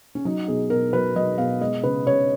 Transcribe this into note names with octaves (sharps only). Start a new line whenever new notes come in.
C#4
F#3 D#4
B2 G#4
B2 A#4
F#3 B4
F#3 D#5
B2 F5
G#3 D#5
C#3 B4
C#3 C#5